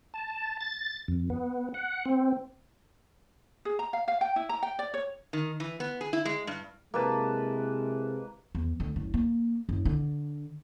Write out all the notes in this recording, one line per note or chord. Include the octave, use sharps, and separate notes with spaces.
A5
A6
F2
B3
F#5
C4
G#4
A#5
F5
F5
G5
E4
A#5
G5
D5
C#5
D#3
E3
B3
G#4
E4
G#3
G2
C3 G#3 A#3 E4 B4 A5
E2
D2
F#1
A#3
F#1
D3